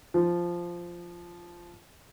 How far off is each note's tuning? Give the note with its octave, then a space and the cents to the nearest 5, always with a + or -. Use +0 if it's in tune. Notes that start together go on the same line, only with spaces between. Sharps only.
F3 -5